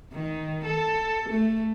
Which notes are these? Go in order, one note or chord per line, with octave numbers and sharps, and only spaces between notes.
D#3
A4
A3